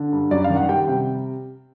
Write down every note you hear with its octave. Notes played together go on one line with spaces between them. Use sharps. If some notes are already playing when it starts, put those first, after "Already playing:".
Already playing: D3
G2
F#2 D5
F5
D#3
F#5
G3 G5
C3